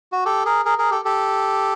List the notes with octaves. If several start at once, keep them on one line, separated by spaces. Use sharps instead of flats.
F#4
G4 A4
G#4 A#4
G#4 A#4
G#4 A#4
G4 A4
G4 A4